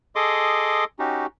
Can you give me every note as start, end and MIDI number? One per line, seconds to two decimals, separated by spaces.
0.16 0.84 68
0.16 0.84 69
0.16 0.84 75
0.16 0.84 84
0.16 0.84 86
0.16 0.84 87
0.99 1.26 61
0.99 1.26 63
0.99 1.26 66
0.99 1.26 67